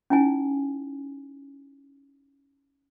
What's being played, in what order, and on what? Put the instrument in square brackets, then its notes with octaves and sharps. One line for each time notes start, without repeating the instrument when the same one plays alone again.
[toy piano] C#4 D#4 E4 G#5